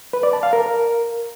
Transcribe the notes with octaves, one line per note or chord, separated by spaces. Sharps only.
B4
D5
A5
F5
A#4